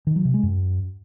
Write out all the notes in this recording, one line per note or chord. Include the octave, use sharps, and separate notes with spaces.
D#3
F#3
C3
G#3
F#2